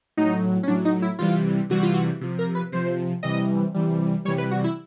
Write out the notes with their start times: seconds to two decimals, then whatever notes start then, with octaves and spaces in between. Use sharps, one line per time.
0.17 A2 F#3 D#4
0.63 C#4
0.68 A2 F#3 D4
0.85 D#4
1.02 E4
1.19 C3 E3 G3 F4
1.70 C3 E3 G3 F#4
1.83 F4
1.94 F#4
2.21 C3 F3
2.39 A#4
2.55 B4
2.72 C3 F3 C5
3.23 C3 E3 G3 D#5
3.74 C3 E3 G3
4.25 C3 E3 G3 C#5
4.38 B4
4.51 F#4
4.64 E4